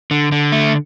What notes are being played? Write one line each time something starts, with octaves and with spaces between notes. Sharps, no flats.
D3
D3
A3